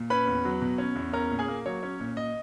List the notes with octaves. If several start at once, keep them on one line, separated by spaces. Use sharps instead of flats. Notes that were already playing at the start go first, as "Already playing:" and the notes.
Already playing: A#2
C#4 B4 B5
E2
F#3
B2
C#4
E2
C#4 A#4 A#5
A#2
G#4 G#5
A#3
F#3 C#5
C#4
A#2
A#2 D#5